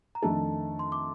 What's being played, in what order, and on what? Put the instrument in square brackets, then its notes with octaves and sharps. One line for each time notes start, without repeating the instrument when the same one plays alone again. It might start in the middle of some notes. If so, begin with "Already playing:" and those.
[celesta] A#5
[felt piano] F2 D#3 A3 D4 A4 [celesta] A5
[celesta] C6
D6